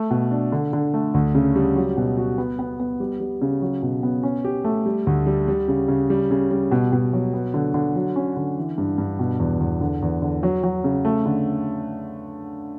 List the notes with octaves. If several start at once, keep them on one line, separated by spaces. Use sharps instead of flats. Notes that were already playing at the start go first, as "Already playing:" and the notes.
Already playing: A3
B2
D4
D3
D3
A3
D2
C#3
G3
F#3
B2
F#4
B3
B3
B3
G3
G3
C#3
F#3
B2
B3
C#4
G4
A3
G3
D2
G3
G3
C#3
C#3
G3
C#3
G3
B2
B2
F#3
B3
D3
D3
F#3
C#4
D3
E3
G2
G2
B2
E2
E2
D3
E2
D3
F#3
F#3
C#3
A3
D3